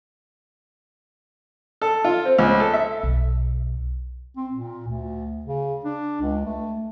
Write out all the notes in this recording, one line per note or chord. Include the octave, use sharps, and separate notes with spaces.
A4
F4
C4
C#2
A4
E5
B1
C4
A#2
D2
C#3
D4
C#2
A3